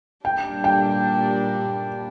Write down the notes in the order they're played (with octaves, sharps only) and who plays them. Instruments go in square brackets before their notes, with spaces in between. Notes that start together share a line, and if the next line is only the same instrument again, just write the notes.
[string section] A#2 G3 D4 [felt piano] G5
[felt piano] G5